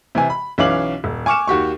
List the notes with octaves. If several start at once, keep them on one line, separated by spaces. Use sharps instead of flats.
C3 E3 G#5
B5
B1 E3 C#4 F5 D6 F#7
D#1
G#5 C#6 D6 F6 C#7 E7
D#2 F#4 G4 C#6